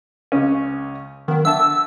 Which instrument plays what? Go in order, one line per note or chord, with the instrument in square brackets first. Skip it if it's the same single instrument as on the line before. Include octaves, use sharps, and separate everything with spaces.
[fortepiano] C#2 C#3 C#4
[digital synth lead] D#3 [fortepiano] F#3 B3
[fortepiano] D3 E5 A5 [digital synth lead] E6